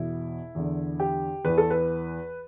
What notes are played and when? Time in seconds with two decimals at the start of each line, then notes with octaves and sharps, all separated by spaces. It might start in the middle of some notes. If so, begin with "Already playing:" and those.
Already playing: E2 B2 E4
0.55 E2 D3
1.00 G4
1.45 E2 E3 B4
1.58 A4
1.70 B4